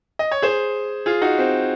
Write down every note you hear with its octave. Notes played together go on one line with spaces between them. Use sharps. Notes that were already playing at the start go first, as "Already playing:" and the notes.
D#5
C#5
G#4 C5
F4 G#4
D#4 F#4
C4